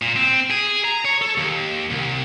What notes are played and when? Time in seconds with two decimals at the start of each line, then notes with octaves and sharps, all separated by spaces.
0.02 A#2
0.16 C4
0.50 G#4
0.85 A#5
1.05 C#5
1.22 A4
1.38 D#2
1.90 C2